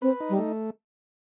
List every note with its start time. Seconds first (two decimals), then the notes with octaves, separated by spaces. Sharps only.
0.02 C4 B4
0.20 D#4
0.29 G3
0.39 A3